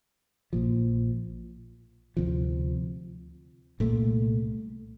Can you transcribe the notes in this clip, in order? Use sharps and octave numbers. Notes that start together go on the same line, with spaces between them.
A#1 A#2 F3
D2 C3 F3
C2 A#2 A3